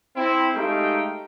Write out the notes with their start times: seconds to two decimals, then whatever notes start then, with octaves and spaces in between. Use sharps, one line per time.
0.16 C4 E4
0.54 G#3 A3 D#4 G4 F5 G5